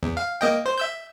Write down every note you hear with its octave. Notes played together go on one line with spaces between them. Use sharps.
E2
F5
A#3 D#5 G5
C5
E5 E6 G6